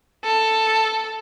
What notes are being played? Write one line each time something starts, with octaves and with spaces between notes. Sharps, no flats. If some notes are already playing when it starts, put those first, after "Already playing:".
A4